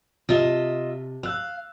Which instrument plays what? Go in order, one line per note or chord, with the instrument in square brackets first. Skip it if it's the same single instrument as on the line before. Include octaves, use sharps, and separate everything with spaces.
[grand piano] C3 A5 G7 [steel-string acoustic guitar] F4 D#5 E5
[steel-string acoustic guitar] F5 [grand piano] E6 F#6